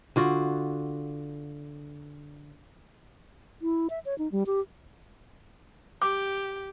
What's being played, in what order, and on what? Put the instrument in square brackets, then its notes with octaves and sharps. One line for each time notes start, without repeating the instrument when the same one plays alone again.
[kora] D3 F4 F#4
[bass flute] E4
E5
C#5
D#4
G3
G4
[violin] G4 [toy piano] D6